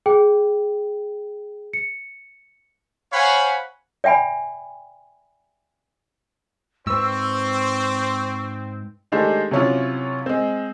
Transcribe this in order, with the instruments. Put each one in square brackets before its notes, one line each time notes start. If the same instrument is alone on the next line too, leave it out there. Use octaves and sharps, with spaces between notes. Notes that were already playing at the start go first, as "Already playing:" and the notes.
[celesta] G#4 G5
C#7
[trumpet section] C5 C#5 F5 F#5 G#5 B5
[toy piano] D5 E5 G5 G#5 B5
[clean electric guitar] G#2 B4 [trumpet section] C4 [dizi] C#6 [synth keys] E6
[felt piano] D#3 G#3 A3 D4 G4 C5
C3 F#3 C#4 E4 F4
G#3 C4